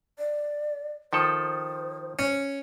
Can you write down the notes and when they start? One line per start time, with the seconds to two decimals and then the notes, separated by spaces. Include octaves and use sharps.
0.18 D5
1.13 D#3 F3 A4 C5
2.19 C#4